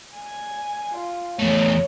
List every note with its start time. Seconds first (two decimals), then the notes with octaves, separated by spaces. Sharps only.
0.16 G#5
0.94 F4
1.39 E2 A3 C#5